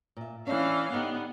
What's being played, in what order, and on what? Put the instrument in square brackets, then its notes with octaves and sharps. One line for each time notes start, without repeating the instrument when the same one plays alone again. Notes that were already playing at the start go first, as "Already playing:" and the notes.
[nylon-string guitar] A#2 E5
[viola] E3 F5 [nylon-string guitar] C#4 D4
[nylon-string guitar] D3 D#4 G4 [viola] B3